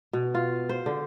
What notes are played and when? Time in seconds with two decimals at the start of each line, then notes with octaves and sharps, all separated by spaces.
0.13 B2
0.35 F4
0.69 C5
0.86 D3